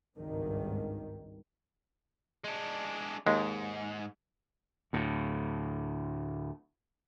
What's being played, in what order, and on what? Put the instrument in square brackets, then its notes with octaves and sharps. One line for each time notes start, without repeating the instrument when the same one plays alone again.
[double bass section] G#1 C#2 G2 D#3
[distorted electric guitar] G#3 D4
[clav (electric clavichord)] D#2 G#3 [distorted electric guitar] G#2
[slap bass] D2 A2